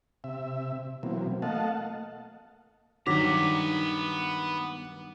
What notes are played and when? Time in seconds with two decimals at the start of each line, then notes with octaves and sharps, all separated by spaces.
0.24 C3 E5
1.03 B2 E3 F#3 A#3 C4
1.42 A3 A#3 D#5 F5 F#5 A5
3.07 G2 D#3 F#3 B3 A#5 D6 B6